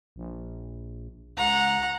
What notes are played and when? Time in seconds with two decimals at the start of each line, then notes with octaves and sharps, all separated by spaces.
0.16 A#1
1.37 C#2 F#5 A#5